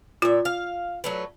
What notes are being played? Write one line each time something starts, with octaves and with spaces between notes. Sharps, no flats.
A#2 F4 E5
F5
F#3 A3 B4